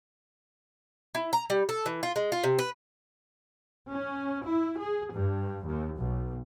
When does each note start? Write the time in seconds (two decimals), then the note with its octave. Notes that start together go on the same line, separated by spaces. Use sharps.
1.15 E4
1.33 A#5
1.50 G3
1.69 A4
1.86 E3
2.03 F4
2.16 G#3
2.32 F4
2.44 C3
2.59 B4
3.91 C#4
4.48 E4
4.79 G#4
5.12 G2
5.67 D#2
5.97 B1